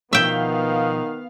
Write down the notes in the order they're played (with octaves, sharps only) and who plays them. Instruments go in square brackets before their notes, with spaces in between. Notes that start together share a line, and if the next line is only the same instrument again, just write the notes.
[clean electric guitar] B2 F3 [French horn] D#3 [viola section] B3 F5 [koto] E5 G5